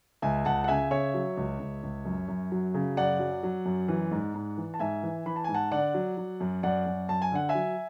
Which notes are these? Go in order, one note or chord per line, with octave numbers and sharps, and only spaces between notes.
C#2 E5 G#5
C#2 F#5 A5
F#5
C#3 E5 G#5
C#3 C#5 E5
F#3
C#2
C#2
C#2
F#2
F#2
F#3
C#3
F#2 D5 F#5
F#3
F#3
F#2
E3
G#2
G#2
E3
A5
G#2 E5 G#5
E3
E3 B5
A5
G#2 G#5
F#5 A5
D3 D5 F#5
F#3
F#3
F#2
F#2 D5 F#5
F#2
F#2 A5
G#5
D3 F#5
E5 G#5
F#3